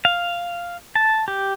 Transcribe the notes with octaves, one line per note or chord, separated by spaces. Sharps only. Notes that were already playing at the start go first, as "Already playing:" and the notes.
F5
A5
G4